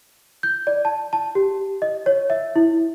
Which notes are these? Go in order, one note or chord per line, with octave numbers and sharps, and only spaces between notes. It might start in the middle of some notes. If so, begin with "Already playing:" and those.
G6
D5
A5
A5
G4
D#5
C#5
E5
E4